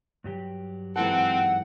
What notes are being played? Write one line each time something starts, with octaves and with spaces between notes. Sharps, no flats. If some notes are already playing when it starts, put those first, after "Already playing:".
G2 F#3 G4
G#2 E3 C4 A4 F#5